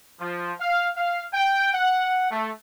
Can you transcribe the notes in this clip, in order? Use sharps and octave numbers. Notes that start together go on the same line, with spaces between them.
F3
F5
F5
G5
F#5
A3